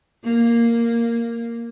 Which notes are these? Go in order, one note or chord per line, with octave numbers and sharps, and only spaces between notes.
A#3